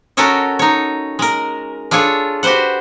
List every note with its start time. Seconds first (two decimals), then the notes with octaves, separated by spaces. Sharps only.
0.17 C#4 F#4 A4 A#4 C#5 D#5
0.59 D#4 C#5
1.19 G#3 A#4
1.91 D4 F4 G#4 A4 C#5
2.43 F#4 G4 B4 C5 F#5